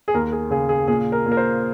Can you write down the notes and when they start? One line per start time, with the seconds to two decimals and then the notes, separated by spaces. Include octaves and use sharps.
0.08 G#4
0.14 D#2 A#4
0.32 G#4
0.50 C#3 G#4
0.69 G#4
0.88 A#2 G#4
1.12 A#4
1.26 A#2
1.32 A#4
1.37 C5